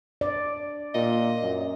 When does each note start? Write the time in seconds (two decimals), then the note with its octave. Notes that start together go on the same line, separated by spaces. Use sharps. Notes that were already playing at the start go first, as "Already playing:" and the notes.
0.21 D5
0.95 A#2 D#5
1.42 F#2